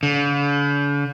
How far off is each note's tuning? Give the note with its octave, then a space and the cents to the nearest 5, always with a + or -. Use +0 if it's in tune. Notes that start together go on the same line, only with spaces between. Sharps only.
D3 -45